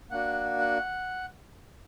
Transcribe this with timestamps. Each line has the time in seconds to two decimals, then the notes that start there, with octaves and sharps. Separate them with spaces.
0.11 A#3 D4 F#4 F#5
0.59 F#5